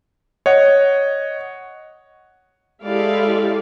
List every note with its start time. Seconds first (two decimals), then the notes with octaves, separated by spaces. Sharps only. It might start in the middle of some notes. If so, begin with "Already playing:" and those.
0.46 C#5 D#5 F#5
2.84 G#3 E4 G4 A4 D5 F5